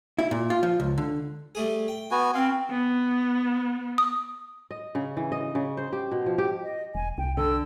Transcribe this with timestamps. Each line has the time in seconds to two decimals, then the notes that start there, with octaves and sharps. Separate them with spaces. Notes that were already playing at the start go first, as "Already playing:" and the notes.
0.19 E4
0.31 A#2
0.50 F4
0.63 F3
0.80 C#2
0.98 D3
1.55 G3 A3 G#4
1.88 G5
2.11 B3 F#4 G#5
2.34 C4 F5 C6
2.71 B3
3.98 D#6
4.71 D#5
4.95 C#3
5.17 E3
5.32 D#5
5.55 C#3
5.77 C5
5.93 G4
6.11 B2
6.26 F3
6.38 G4
6.63 D#5
6.95 E1 G#5
7.18 C2 G5
7.37 D3 E6